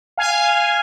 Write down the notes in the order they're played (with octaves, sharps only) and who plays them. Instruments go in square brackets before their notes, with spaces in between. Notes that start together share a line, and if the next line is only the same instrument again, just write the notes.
[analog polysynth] F5 G#5